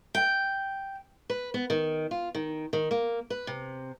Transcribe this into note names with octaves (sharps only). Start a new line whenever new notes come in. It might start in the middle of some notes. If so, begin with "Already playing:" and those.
G5
B4
B3
D#3
F4
D#3
D#3
A#3
B4
C3